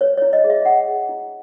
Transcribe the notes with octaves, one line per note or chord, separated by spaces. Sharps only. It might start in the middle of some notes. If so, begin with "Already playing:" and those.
B4 C#5
E4 C#5
D#5
G#4
E5
E4 F#5
G#4
E4